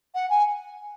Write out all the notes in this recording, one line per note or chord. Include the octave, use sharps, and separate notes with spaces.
F#5
G#5